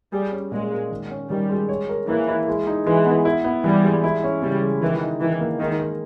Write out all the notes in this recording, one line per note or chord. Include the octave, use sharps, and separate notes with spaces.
G3 G#4
C#4
A#2 G#3
A#3
D#3
C#4
D#3 G3
G#3
C#5
A#4
E3 A#3
E4
G#3
D#4
E3 G#3
B3
E4
B3
E3 G3
G#3
E4
C#4
C#3 G3
G#3
D#3 E3
D#4
D#3 E3
A#3
D#3 G#3
A#4